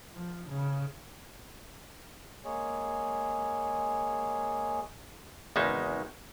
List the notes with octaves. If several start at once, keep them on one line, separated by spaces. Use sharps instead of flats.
F3
C#3
G#3 A#3 G#4 C#5
G#1 E2 C#3 G#3 D#4 E5